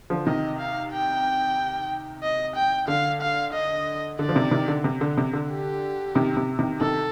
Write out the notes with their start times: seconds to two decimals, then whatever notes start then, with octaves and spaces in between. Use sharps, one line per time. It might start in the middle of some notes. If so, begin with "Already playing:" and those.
0.10 D3 F3
0.26 C3 D#3 D#5
0.59 F5
0.93 G5
2.23 D#5
2.56 G5
2.88 D3 F5
3.22 F5
3.53 D#5
4.19 D3 D5
4.29 F3
4.35 C3 D#3
4.51 C3 D#3
4.68 D3
4.84 C3
5.01 D3
5.18 C3
5.33 D3
5.50 G4
6.15 C3 D#3
6.37 C3
6.59 C3 D#3
6.81 C3 D#3 A4